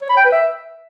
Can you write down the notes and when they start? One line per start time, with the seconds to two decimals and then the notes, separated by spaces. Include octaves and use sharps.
0.01 C#5
0.09 B5
0.17 G5
0.24 B4
0.32 E5